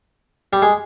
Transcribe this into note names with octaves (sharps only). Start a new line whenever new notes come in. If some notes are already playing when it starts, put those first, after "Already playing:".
G3
G#3